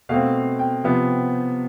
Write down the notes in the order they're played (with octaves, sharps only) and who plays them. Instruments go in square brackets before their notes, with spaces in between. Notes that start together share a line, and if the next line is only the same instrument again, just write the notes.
[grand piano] B2 A3 C4 F5
G5
C3 F3 B3